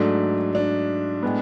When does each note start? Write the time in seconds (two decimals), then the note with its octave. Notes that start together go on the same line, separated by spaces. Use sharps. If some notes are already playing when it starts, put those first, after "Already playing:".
Already playing: G#2 F#3 A3 D4
0.55 D4
1.23 A2 G#3 B3